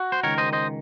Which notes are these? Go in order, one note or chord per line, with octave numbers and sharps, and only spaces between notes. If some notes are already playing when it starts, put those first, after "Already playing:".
Already playing: F#4
C5
C#2 C3 D#3 A#4 C#5
C5 D#5
C5 D#5